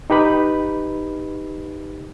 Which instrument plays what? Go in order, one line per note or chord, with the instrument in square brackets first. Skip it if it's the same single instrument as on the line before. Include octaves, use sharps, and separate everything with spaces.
[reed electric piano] D#4 G4 B4 B5